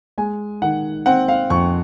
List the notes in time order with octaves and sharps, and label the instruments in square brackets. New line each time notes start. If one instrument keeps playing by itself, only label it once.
[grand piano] G#3 G#5
D#3 F#5
C4 F#5
F5
F2 C#6